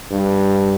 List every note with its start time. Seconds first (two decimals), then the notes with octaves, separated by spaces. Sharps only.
0.11 G2